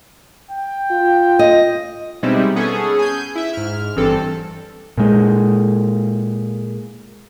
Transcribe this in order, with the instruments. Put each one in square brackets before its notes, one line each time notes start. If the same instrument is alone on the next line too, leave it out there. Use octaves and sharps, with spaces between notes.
[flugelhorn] G5
[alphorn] F4
[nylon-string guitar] D#5
[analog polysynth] B2 G3 G#3 C4 D#4 E4
B3 C#4 G#4 A4
G#5 G6
E4 E5
G#2 F6
G1 G2 E3 C4 A4
[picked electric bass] A#2 G#3